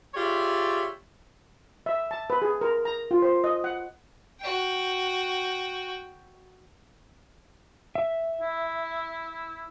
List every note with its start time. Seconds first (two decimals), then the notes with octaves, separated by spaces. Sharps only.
0.14 F4 G4 G#4 C#5 D5 E5
1.86 E5
2.11 A5
2.30 B4
2.42 G#4
2.61 A#4
2.85 A#5
3.11 F4
3.22 C5
3.44 D#5
3.64 F#5
4.40 F#4 G5
7.95 E5
8.41 E4